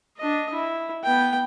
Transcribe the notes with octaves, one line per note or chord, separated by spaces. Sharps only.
D4 D#5
E4
B3 G5